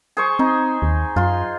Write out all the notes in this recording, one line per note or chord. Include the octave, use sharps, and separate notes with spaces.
G#4 C5 C#6
C4 D#4
D#2
F#2 F4 C6